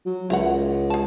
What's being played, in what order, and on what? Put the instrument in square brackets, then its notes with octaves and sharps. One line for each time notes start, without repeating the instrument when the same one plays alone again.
[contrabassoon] F#3
[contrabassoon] C#2 [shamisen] E4 A#4 F#5
[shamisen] G#4 A5